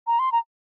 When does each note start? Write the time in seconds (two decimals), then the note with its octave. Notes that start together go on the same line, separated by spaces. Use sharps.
0.07 A#5
0.19 C6
0.32 A#5